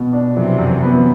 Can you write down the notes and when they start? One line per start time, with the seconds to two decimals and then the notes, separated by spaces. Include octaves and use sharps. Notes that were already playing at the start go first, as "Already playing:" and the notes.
Already playing: B2
0.13 D4
0.36 C3 E3 F#3
0.59 F#2
0.83 B3